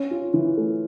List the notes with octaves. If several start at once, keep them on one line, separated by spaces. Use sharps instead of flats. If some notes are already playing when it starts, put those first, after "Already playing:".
Already playing: C#4
F4
E3
A3